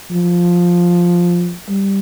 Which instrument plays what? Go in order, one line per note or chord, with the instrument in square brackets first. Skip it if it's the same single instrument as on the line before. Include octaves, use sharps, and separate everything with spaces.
[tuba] F3
G3